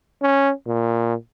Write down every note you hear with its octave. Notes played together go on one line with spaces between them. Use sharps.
C#4
A#2